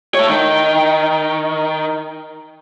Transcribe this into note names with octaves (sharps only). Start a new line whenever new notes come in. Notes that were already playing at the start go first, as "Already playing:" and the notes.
A3 C#5
D#3